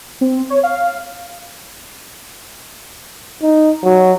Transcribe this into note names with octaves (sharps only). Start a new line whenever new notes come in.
C4
C#5
F5
D#4
F#3